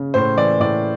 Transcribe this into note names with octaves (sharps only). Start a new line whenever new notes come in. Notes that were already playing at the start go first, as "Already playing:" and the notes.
Already playing: C#3
A2 C5
E3 D5
A2 D5